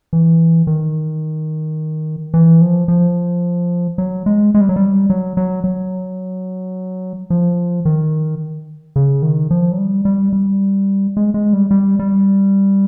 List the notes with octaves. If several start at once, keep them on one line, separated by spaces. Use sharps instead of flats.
E3
D#3
E3
F3
F3
F#3
G#3
G#3
G3
F#3
G3
F#3
F#3
F#3
F3
D#3
C#3
D#3
F3
F#3
G3
G3
G3
G#3
G#3
G3
G3
G3